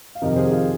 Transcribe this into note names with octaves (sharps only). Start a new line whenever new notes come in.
F5
F2 C3 D#3 A#4 D#5
G#4 C5
F4